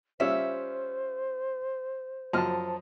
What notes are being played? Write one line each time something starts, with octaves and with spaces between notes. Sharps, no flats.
G3 C#4 F4 C5 E5
F#2 F3 C5 D#5 A5 F6